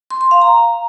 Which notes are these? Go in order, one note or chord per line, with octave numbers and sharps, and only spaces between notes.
C6
C6
F5
A#5